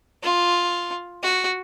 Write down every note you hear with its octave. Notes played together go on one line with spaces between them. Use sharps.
F4
F#4